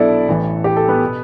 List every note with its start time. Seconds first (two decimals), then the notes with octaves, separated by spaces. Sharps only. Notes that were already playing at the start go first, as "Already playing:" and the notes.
Already playing: B1 B2 D4 E4 A4 D5 E5
0.29 A1 A2 E3
0.64 G4
0.77 A4
0.88 B3 B4
1.04 B2